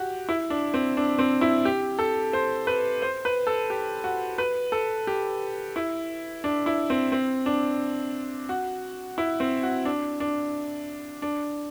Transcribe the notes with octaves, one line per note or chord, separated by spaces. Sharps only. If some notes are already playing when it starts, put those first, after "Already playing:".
Already playing: F#4 G4
E4
D4
C4
D4
C4
E4
G4
A4
C5
B4
C5
B4
A4
G4
F#4
B4
A4
G4
E4
D4
E4
C4
C4
D4
F#4
E4
C4
F#4
D4
D4
D4